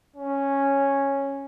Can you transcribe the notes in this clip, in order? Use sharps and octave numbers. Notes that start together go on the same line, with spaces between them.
C#4